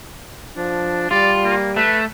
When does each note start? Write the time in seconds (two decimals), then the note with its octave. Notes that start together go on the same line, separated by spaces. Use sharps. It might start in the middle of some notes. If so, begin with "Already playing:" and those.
0.57 F3 D4
1.11 G3 F4 D5
1.44 A#3
1.76 A3 B4